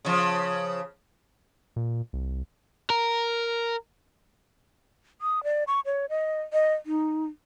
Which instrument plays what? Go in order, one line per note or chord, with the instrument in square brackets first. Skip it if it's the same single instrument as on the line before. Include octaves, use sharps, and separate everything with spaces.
[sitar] C#3 F3
[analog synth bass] A#2
C2
[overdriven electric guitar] A#4
[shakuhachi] D#6
D5
C#6
C#5
D#5
D#5
D#4